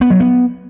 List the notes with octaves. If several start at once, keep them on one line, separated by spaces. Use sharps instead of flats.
B3
F#3
B3